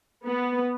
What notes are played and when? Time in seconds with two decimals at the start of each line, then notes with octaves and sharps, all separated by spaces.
0.25 B3